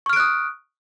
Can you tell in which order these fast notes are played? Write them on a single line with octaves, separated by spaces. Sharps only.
C#6 F6 D7 F#6 D#6